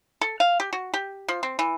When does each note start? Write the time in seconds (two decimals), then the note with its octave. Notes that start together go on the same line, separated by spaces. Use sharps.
0.21 A4
0.40 F5
0.60 G4
0.73 F#4
0.94 G4
1.28 F3
1.43 C4
1.59 E3